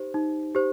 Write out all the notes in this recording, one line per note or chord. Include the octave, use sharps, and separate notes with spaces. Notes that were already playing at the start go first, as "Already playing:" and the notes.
Already playing: D#4 G4 C5
D#4
G4 C5